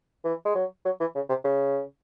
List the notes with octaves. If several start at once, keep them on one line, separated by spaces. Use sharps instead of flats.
E3
G#3
F#3
F#3
E3
C#3
C3
C#3